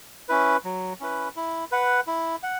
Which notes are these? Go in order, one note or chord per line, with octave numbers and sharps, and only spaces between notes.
C#4 E4 B4
F#3
C#4 E4 B4
E4
B4 F#5
E4
F#5